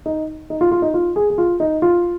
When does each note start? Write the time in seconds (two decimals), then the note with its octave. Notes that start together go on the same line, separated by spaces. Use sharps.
0.06 D#4
0.50 D#4
0.61 F4
0.71 F4
0.82 D#4
0.94 F4
1.16 G#4
1.30 G#4
1.38 F4
1.60 D#4
1.82 F4